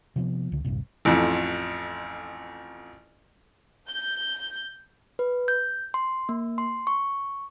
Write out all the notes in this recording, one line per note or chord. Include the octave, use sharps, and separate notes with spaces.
C3 F3 B3
C#2 D3
D#1 A#1 G2 C3
A1 F2
G6
B4
G6
C6
A#3
C6
C#6